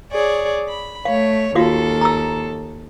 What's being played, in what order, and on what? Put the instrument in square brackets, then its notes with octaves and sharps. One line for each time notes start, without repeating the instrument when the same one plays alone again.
[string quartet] G#4 C#5 D5
B5
[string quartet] A3 C#5 [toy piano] F5
[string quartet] D#2 A4 [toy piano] F4 F#4 F5
[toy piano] A#5 E6